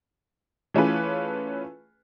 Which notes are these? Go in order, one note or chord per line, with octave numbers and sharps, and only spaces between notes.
E3 A3 C#4 F4 G#4 B4